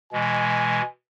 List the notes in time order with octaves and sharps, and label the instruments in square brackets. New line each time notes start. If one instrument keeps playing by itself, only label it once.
[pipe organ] B2 E3 G#3 [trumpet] G#5